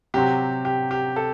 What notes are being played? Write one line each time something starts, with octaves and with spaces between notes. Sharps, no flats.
C3 F#3 C4 G4
G4
G4
A4